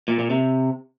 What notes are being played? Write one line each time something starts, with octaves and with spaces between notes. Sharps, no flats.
A#2
A#2
C3